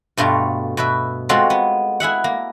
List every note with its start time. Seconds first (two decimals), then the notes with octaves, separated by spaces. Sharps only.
0.17 G2 B2 A3 F4
0.77 B2 B4 E5
1.29 G#3 C4 F4 F#4 A4
1.50 B3
2.00 E4 G#4 E5 F#5
2.24 A#3